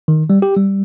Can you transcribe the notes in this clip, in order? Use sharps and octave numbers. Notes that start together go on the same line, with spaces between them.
D#3
G3
G4
G3